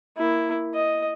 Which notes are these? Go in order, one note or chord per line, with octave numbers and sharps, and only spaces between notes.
A#3 E4
D#5